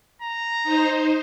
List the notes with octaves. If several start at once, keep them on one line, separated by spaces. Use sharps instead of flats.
A#5
D#4 C5